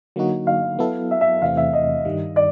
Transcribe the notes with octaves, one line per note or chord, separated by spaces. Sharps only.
D3 F#3 A#3 D#4 F#4
F5
F#3 B3 E4 A4
E5
E5
E2 C3 E3 A3 C4 F5
E5
D#5
G2 D#3 G3
D5